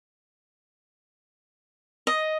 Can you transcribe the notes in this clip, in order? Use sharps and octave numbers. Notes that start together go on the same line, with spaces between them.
D#5